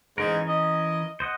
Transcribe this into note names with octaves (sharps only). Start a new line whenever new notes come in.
G#2 E3 C#4 A#4
D#5
C5 D#5 F#5